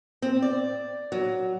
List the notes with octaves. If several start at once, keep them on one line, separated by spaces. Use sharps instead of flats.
C4
D5
F#3